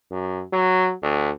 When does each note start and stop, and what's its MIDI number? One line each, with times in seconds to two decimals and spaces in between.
0.11 0.43 42
0.53 0.93 54
1.03 1.30 38